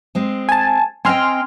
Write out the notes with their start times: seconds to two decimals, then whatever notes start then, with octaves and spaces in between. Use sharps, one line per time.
0.15 G#3 C4
0.49 G#5 A5
1.05 C4 D#5 G5 G#5 C6 F6